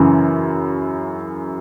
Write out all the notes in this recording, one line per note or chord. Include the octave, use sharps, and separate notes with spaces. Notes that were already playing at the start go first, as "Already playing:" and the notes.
Already playing: F#2 C#3 E3